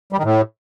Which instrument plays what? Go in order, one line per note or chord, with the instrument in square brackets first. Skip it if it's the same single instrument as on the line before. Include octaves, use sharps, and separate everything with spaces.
[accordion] G3
D#3
A2